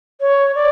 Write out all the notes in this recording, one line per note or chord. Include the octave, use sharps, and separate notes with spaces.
C#5
D5